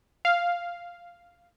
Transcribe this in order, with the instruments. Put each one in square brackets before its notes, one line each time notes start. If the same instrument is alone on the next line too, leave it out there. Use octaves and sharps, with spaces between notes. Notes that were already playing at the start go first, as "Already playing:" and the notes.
[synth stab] F5